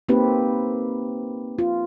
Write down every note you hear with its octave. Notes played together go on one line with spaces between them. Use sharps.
A#3 C4 D#4 G4 B4
F4